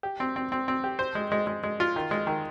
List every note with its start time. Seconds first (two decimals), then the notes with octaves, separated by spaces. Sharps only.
0.03 G4
0.20 C4
0.36 C4
0.52 C4
0.68 C4
0.84 G4
0.99 C5
1.15 G#3
1.32 G#3
1.47 G#3
1.63 G#3
1.80 F4
1.96 D#3
2.11 G#3
2.27 D#3